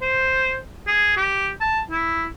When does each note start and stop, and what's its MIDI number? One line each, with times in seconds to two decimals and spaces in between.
0.02 0.57 72
0.87 1.13 68
1.17 1.49 67
1.60 1.79 81
1.90 2.26 64